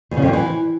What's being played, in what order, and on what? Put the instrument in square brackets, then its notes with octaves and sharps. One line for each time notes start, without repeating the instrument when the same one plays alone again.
[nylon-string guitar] E2
C#3
F2
F3
E3